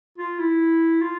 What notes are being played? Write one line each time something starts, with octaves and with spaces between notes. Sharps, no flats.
F4
E4
F4